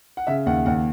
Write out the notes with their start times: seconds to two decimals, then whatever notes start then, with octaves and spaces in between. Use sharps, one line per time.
0.17 F#5
0.27 C#3 E5
0.46 D#2 F#5
0.66 D#2 F#5